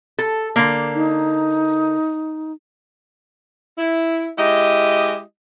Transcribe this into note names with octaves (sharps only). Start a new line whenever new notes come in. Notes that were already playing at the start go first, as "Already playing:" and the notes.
A4
D3 A#3
D#4
E4
G#3 E4 G4 D#5